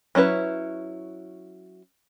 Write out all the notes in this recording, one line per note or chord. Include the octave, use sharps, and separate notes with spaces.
F#3 C#4 E4 B4